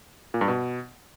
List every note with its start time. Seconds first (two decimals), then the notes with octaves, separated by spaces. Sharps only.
0.34 A#2
0.41 G2
0.48 B2